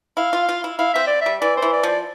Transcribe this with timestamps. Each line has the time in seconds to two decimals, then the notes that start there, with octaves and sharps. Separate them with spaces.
0.17 E4 F5
0.33 F4
0.49 F4
0.64 E4
0.79 E4 F5
0.94 C4 E5
1.07 D5
1.21 G3 E5
1.42 E3 D5
1.57 C5
1.62 E3
1.72 D5
1.83 F3 D5